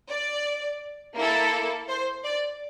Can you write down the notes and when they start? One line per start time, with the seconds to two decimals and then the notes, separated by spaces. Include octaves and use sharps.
0.11 D5
1.17 A#3 E4 A4
1.89 C5
2.24 D5